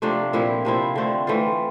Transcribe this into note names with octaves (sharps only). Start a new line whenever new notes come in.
C3 F3 A3 D4
A#2 F3 C4 E4
C3 F3 C4 E4
D3 A3 C4
E3 A3 C4 F4